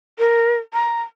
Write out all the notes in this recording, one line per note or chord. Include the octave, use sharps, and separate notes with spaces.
A#4
A#5